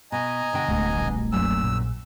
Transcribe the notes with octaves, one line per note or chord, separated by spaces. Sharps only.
B2 D#5 G#5 A#5
B2 D3 G5
D1 D2 G#3
A#1 G3
F#2 A#2 E6
A#1